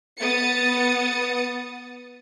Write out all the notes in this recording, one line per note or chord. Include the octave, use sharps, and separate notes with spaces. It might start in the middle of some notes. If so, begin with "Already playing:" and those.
B3 D#6 A6 C#7